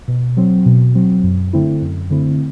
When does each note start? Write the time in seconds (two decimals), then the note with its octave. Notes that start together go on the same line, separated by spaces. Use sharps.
0.08 B2
0.37 F#3 C4
0.66 B2
0.95 F#3 C4
1.23 F#2
1.53 D3 A3 C4 E4
1.82 F#2
2.10 D3 A3 C4 E4